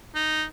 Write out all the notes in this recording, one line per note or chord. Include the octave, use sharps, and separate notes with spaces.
D#4